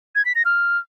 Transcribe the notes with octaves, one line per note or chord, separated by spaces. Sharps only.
G#6
B6
A#6
F6